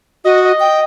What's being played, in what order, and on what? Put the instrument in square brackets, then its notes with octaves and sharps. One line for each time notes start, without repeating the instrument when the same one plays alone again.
[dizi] F#4 [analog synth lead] D#5
[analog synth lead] D#5
[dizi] G5